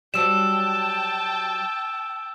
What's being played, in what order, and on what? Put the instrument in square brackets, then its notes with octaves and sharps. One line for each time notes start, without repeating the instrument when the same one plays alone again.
[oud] F#3 G3 [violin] G5 A5 [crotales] E6 E7